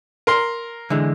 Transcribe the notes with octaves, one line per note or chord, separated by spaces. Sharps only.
A#4 C6
D3 E3 G#3